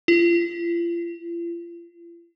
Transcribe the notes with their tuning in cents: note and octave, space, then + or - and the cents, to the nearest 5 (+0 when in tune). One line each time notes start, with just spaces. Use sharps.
F4 -45